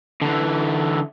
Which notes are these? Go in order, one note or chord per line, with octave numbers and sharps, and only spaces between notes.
D3 E3